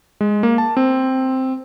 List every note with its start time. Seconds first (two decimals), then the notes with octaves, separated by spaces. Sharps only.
0.21 G#3
0.43 A#3
0.58 A5
0.77 C4